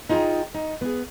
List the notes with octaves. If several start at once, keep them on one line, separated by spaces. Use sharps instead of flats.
D#4 F4 G#4 D#5 G5 A#5
D#4
B3 G#4